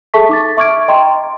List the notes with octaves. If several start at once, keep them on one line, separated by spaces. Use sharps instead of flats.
G#4 A4 E5 A5 C#6 B6
D#4 D6 A6
E5 C#6 D6 F6 G#6 D7
D#5 G5 A#5 C6